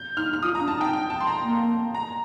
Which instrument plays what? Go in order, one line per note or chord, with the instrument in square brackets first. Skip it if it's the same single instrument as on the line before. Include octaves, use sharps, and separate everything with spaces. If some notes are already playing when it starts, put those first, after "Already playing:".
Already playing: [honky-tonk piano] G6
[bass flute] D#4 [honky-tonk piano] F6
[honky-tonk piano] F6
[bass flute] F4 [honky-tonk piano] D#6
[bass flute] D4 [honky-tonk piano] A#5
[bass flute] D#4 [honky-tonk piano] A5
[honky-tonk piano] G5
G5
A5
C6
A#5
[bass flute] A#3
[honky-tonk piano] A#5